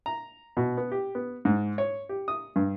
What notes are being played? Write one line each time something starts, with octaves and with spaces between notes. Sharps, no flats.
A#5
B2
B3
G4
B3
G#2
C#5
G4
D#6
G2